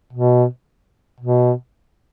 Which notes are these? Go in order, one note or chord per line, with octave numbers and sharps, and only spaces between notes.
B2
B2